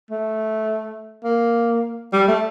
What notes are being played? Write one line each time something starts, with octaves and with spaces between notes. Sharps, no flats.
A3
A#3
G3
A3